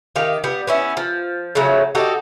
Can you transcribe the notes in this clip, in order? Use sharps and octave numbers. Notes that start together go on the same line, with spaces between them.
D#3 G4 F5
G3 B3
B3 C#4 E4
F3
C#3 F3 F#3 A3
D#4 F#4 G4 A4